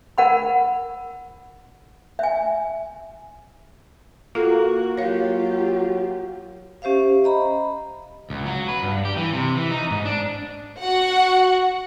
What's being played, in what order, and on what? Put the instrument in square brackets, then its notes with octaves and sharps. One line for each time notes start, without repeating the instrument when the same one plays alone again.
[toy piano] A#4 F#5 B5
E5 G#5
[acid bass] A#3 [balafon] F4 A4 [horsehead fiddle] F#4
[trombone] F#3 [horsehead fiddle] F4 G4 [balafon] C#5 F5
[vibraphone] C#4 G4 C5 E5 F5
D#5 A#5 B5
[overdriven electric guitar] C#2
F#3
B4
G2
G4
E3
C3
E3
D#4
G#2
D4
[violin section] F#4 F#5